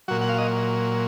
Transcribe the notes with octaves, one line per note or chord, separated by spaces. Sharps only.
A#2 F#3 F#4
F#5
F5
D#5